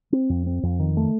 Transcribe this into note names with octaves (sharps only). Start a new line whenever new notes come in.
C4
F2
C4
F2
D#3
A3